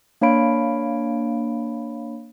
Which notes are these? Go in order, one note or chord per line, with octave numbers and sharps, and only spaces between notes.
A#3 D4 C#5 F5 B5 D7